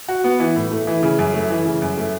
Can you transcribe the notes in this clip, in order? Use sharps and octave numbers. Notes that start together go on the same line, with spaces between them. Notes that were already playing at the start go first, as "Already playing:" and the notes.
F#4
B3
E3
A2
A3
E3
C#3
F#2
A3
E3
C#3
F#2
A3